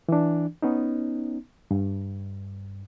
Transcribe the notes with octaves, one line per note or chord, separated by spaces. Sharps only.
E3 D4
B3 C#4 D#4
G2